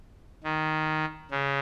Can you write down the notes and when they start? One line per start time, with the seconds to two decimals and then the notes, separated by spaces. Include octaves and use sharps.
0.44 D#3
1.31 C#3